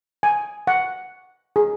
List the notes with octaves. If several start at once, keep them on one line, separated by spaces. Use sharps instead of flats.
G#5
F#5
G#4